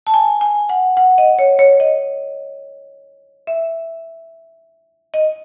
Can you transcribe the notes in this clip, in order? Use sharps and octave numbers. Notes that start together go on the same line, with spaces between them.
A5
G#5
G#5
F#5
F#5
D#5
C#5
C#5
D#5
E5
D#5